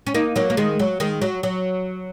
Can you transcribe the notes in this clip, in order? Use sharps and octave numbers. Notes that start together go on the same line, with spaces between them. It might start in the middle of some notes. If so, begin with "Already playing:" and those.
C#4
A#3 D#4
F#3 A#3
A#3
D#3 G#3
F#3
D#3 G#3
F#3
F#3